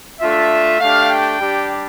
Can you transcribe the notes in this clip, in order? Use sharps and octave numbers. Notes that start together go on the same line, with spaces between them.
A3 D4 F4 E5
A3 D4 G4 F5
G5
G3 D4 G4